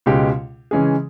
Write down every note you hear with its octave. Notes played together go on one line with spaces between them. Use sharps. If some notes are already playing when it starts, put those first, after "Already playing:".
C#2 B2 G#3 C#4 G4
C#3 E3 G#3 C#4 G#4